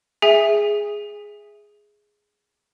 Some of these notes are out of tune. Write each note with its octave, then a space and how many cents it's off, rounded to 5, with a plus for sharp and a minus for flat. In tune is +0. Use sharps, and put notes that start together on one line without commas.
G#4 +0 E5 +0 G#5 -25